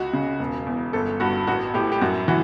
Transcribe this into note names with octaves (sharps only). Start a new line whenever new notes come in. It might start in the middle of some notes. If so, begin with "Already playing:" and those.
Already playing: C#2 F#4
C#3
E1
E2
G1 A4
G2 F#4
A1 F#4
A2 G4
G4
F#2 F#4
E3 F#4